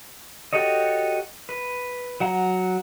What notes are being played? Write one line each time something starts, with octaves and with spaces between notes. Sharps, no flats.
F#4 G4 A4 C#5 D#5
B4
F#3 F#5 A#5